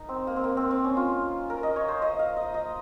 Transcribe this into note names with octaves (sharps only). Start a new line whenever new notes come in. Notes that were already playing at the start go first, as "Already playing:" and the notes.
Already playing: D#4 A#4
C4
A#3
C4
A#3
C4
C4
C#4
F4
A#4
D#5
C#5
C5
D#5
F5
D#5
D#5